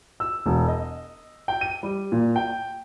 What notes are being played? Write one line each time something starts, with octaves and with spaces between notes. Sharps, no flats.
E6
E1
D#5
G5
D#7
G3
A#2
G5